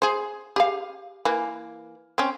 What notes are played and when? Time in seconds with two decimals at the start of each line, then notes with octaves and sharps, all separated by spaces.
0.02 G#4 C5
0.56 G4 G#4 F5
1.25 E3 A#3
2.18 C4 C#4